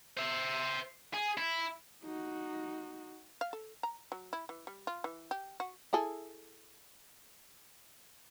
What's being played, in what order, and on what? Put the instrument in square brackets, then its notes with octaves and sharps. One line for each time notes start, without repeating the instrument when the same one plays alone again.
[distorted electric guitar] C5 E5
G#4
E4
[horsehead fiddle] D#4 F#4
[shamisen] F5
A4
A#5
F#3
E4
E3
G3
F4
E3
G4
F#4
E4 G#4 A4